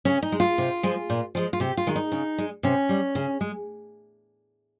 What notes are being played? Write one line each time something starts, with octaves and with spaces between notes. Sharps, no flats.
C#3 C#4
D#4
G#3
F4
C3
F3 G#3
A#2
F3 G#3
F4
C3 G4
F4
D#3 G#3
D#4
C#3
G#3
C3 C#4
G3
C#3
G#3